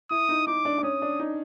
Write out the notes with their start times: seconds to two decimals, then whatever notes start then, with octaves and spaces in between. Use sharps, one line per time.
0.10 E4 D#6
0.29 D#4
0.47 D#4 D6
0.65 D4
0.78 D4
0.83 C#4 D#6
1.02 D4
1.20 D#4